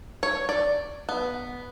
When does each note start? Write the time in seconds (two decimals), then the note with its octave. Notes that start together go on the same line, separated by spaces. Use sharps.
0.23 C#5
0.49 D5
1.09 B3